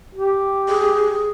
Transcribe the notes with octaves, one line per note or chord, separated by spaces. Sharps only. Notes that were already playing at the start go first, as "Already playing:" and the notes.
G4
G#4